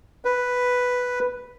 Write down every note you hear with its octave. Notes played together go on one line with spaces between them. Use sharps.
B4